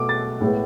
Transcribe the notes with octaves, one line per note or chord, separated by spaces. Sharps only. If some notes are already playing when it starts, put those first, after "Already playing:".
Already playing: B2 A3 D6
A6
A2 G#3 B3